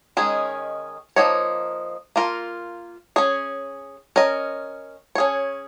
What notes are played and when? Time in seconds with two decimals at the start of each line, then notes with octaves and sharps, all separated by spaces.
0.17 D#3 G#3 C#4 G#4
1.16 F3 A#3 D#4 C#5
2.16 A#3 F4 A#4
3.16 C#4 G#4 C#5
4.16 C#4 A#4 D#5
5.15 C#4 G#4 C#5